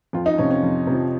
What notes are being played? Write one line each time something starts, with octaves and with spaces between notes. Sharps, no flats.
F2 F4
D#4
C3 F3 C#4
C#4
F2
C3 F3